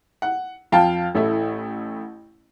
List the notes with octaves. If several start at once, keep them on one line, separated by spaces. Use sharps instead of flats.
F#5
F2 F5 G5 A5
A1 A3 E4